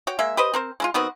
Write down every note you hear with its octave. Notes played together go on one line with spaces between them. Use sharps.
F#4 C#5 G5
G#3 A#3 E5
G4 B4 C5 D#5
C4 A#4 C5
G#3 E4 F4
D#3 B3 C4 F#4